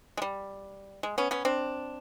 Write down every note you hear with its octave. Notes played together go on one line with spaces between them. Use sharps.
G#3
G3
G#3
B3 C#4
B3 C#4
C4 D4